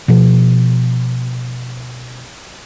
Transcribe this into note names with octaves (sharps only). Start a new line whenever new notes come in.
B2 F3